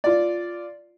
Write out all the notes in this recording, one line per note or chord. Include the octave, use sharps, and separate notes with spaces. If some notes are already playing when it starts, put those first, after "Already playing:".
F4 D5